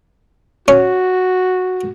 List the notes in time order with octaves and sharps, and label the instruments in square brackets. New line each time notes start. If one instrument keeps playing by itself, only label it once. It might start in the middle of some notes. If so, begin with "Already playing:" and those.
[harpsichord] C#4 [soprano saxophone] F#4